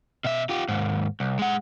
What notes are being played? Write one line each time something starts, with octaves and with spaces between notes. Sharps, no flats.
B2 E5
F4 G4
D#2 G#2
C2
G#3 F#5